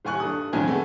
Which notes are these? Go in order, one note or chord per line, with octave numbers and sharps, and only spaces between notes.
D#1 D#2 G#5 C#6 F#6
G2 A4 D#6
B1 F2 D3 D#3 G#5 G#6
A3 B3 G#4